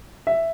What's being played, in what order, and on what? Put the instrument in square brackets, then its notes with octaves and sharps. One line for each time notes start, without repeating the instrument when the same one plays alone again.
[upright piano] E5